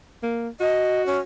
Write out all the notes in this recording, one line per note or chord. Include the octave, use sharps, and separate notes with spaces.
A#3
F#4 D#5
C#4